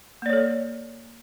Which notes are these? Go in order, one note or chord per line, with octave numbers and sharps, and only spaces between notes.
A#3 A4 C#5 D5